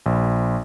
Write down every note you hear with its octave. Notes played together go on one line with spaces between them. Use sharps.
A#1